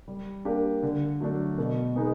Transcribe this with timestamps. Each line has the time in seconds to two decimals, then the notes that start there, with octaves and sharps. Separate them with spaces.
0.08 G3
0.45 A#3 D4 G4
0.83 D3
1.21 F#3 A3 D4
1.58 B2
1.96 G#3 B3 D#4 G#4